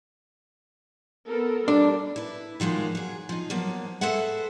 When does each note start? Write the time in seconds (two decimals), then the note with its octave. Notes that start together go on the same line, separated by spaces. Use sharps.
1.26 B3 A4 A#4
1.68 G3 D4
2.16 E4 B4
2.60 D#3 F3 F#3 G#3 A#3
2.95 F#3 G#4
3.29 F3 D#4
3.50 F3 F#3 A#3 B3
4.01 G#4 A4 B4 C5 E5 F#5